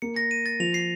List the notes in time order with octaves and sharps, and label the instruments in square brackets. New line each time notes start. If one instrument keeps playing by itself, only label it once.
[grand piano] A#3 [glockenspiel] C#7
[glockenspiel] A#6
D#7
A6
[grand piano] F3 [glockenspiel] F7
[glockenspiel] C7